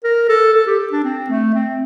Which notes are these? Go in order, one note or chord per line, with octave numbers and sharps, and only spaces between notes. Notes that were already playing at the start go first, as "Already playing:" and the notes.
A#4
A4
A4
G4
D4
C4
A3
C4